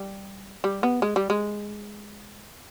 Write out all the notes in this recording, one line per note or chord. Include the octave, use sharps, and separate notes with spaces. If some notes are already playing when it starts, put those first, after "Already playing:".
Already playing: G3
G3
B3
G#3
G3
G#3